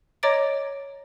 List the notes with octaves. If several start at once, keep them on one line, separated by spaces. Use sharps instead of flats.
C#5 D#5 A#5 D6 A6 D7